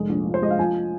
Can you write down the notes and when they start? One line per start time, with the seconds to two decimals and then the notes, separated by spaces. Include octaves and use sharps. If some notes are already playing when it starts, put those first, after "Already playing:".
Already playing: F1 G#3
0.09 A#1
0.26 F3
0.34 C5
0.42 G#3 D#5
0.51 F5
0.59 F3 G#5